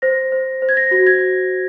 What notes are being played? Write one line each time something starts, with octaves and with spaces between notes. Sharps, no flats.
C5 A#6
C5
C5
G#6
A#6
F#4 A#6
G#6